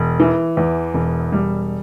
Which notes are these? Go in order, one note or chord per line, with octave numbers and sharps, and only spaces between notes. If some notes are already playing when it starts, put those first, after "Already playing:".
Already playing: E1
E3
E2
E1
G3